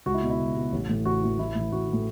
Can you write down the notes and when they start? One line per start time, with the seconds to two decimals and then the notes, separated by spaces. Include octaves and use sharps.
0.06 C#2 F#4
0.14 E4
0.23 B2
0.30 E4
0.40 C#2
0.56 B2
0.72 A1
0.89 A2 E3
1.05 A1 F#4
1.22 A2 E3
1.38 A1 E4
1.55 A2 E3
1.72 A1 F#4
1.88 A2 E3